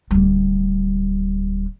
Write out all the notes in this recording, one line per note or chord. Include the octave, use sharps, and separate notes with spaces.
D1 G3